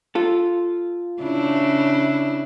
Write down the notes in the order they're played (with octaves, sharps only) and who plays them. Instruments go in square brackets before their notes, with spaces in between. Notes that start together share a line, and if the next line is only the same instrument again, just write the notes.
[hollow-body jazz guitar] F4 A4
[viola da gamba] C#3 D4 E4